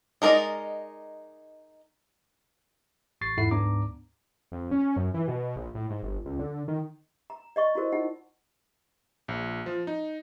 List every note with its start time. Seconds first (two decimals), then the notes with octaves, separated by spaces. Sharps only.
0.22 G#3 D#4 A#4 D5 D#5
3.21 A1 C#6 A6 C7
3.37 E2 G#2 E4 A4 F#5 C7
3.51 D2 G#2 B3 D4 A#5 D6
4.52 F2
4.71 C#4
4.96 F#2
5.14 E3
5.28 B2
5.56 A#1
5.75 A2
5.90 G#2
6.03 G1
6.25 C#2
6.39 D3
6.68 D#3
7.30 A#5
7.56 D5 D#5 C#6
7.75 E4 F#4 A#4 C5
7.92 D#4 F4 F#5
9.28 A#1
9.66 F3
9.87 D#4